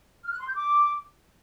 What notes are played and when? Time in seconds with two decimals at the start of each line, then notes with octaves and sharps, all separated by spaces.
0.24 F6
0.32 F#6
0.40 C6
0.48 G6
0.55 D6